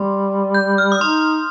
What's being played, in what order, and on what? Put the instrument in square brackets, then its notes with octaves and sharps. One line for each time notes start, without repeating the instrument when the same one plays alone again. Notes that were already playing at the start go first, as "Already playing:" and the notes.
Already playing: [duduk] G3 [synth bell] C6
[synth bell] G6
F6
D#6
[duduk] D#4 [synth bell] C6